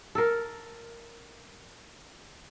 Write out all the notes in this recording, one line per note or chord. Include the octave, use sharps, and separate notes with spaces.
A4 A#4